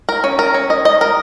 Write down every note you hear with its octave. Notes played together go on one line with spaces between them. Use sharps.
A#4
C#4
A#4
C#4
D#5
D#5
A#4